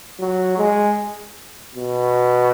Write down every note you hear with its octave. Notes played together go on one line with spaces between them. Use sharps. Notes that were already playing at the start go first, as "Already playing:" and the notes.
F#3
G#3
B2